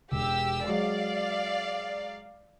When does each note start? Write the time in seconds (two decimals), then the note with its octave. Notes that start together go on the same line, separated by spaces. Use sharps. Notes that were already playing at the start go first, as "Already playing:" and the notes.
0.12 E1 G4 E6
0.67 F#3 G#3 D5 F5